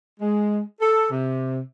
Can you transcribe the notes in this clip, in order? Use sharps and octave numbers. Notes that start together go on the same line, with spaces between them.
G#3
A4
C3